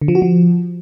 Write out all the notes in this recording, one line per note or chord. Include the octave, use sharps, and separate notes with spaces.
D3
F3
F#4
F3